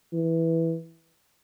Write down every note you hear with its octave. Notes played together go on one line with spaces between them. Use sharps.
E3